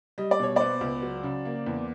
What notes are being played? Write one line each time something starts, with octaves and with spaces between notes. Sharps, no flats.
G3 D#5
D5
B2 C#5
B3 C5 D5
C#2
F#3
C#3
A#3
E2